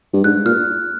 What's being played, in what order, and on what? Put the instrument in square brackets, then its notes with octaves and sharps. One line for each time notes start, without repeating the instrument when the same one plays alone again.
[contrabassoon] G2
[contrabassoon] G#2 [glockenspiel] F#6
[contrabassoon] A#2 [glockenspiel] F6